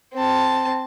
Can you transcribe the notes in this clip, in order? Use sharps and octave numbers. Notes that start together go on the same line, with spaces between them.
C4 A5